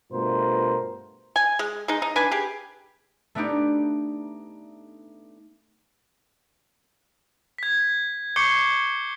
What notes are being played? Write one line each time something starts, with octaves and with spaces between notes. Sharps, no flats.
G2 B2 A3 F4 A#4 C5
G#5
G#3
G#3 D#4
D#4
D4 B4 G#5
G4 G#4
A3 B3 D4 D#4 G4
G#6 B6
C#6 D6 G6 C7 C#7 G7